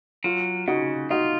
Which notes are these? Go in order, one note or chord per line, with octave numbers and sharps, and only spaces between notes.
F#3 F4
C#3 D#4 F#4
D#4 F4 F#4